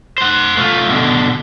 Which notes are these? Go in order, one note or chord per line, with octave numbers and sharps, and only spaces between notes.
C5 F#5
A3 F4
B2 D3